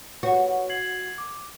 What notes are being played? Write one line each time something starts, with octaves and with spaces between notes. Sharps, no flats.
F#4 B4 C#5 F#5
G#6 C7 F#7
D6